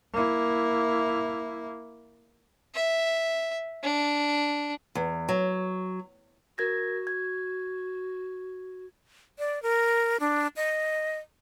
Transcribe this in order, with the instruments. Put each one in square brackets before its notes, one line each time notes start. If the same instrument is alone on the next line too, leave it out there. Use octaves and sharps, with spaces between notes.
[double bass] A#3 E4
[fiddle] E5
D4
[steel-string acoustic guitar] E2
F#3
[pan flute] F#4 [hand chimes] A#4 G#6 A#6
[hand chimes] G#6
[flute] D5
A#4
D4
D#5